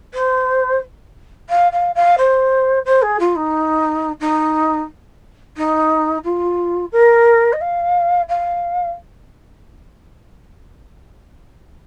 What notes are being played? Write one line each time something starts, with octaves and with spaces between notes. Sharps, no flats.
C5
F5
F5
F5
C5
C5
G#4
F4
D#4
D#4
D#4
F4
A#4
D#5
F5
F5